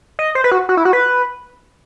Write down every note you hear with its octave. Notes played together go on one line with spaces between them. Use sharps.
D#5
C5
B4
F#4
F#4
E4
F#4
B4